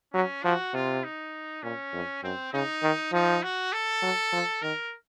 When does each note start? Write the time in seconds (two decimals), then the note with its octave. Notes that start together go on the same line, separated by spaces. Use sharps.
0.14 F#3 C#4
0.44 F3 F#4
0.74 C3 F4
1.04 D#4
1.63 A#2 C#4
1.93 F2
2.23 F#2 C4
2.53 C#3 D#4
2.82 D#3
3.12 F3 D#4
3.43 F#4
3.73 A4
4.02 F#3
4.32 F3
4.62 D#3 A#4